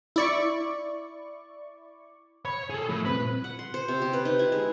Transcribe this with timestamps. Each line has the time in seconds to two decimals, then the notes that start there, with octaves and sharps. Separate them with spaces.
0.16 E4 D5 C#6
2.45 C#5 B5
2.70 G#4 A4
2.89 A2 F3
3.06 A#2 G3 C4 B4
3.44 F#5
3.59 C6
3.74 C5
3.88 C3
4.02 G4
4.13 B4
4.25 D#4
4.39 E4
4.52 G#3